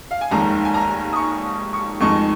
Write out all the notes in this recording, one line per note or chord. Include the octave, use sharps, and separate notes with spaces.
F5
G#5
F1 D#2 D#3 G#3 A#5
G#5
A#5
D#6
C#6
C#6
F2 D#3 G#3 D#4 C#6